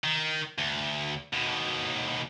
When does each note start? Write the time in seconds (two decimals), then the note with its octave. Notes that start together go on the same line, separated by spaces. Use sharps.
0.04 D#3
0.58 D2
1.33 D#2 B2